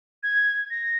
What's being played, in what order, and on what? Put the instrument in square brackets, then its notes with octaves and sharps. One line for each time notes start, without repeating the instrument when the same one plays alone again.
[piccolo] G#6
A#6